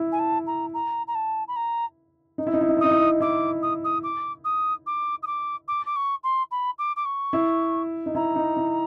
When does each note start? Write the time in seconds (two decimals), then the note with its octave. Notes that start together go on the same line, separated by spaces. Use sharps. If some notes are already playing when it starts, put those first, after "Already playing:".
Already playing: E4
0.12 G#5
0.19 A5
0.46 A#5
0.74 A#5
1.07 A#5
1.15 A5
1.47 B5
1.56 A#5
2.38 D#4
2.47 E4
2.54 D#4
2.61 E4
2.69 D#4
2.77 E4
2.80 D#4 D#6
2.91 E4
2.99 D#4
3.20 E4 D6
3.62 D#6
3.84 D#6
4.03 D6
4.44 D#6
4.86 D6
5.22 D#6
5.26 D6
5.68 D6
5.86 D6
5.96 C#6
6.23 C6
6.51 B5
6.78 D6
6.96 D6
7.05 C#6
7.33 E4
8.06 D#4
8.15 E4 A#5
8.36 D#4
8.57 E4